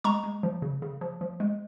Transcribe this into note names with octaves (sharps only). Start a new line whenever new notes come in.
G#3 A#5 C#6
G#3
F3
C#3
C#3
F3
F3
G#3